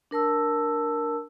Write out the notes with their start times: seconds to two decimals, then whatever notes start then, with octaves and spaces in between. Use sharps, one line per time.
0.11 D4 A#4 A5 E6